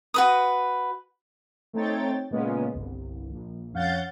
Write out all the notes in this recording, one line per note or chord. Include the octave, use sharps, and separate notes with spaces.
F#4 B4 D#6
A3 C4 D#4 C#5 G5 A6
A#2 C#3 G#3 B3 C#4 F4
G1 C2
A#1
F2 C#4 F5 F#5 G6 A6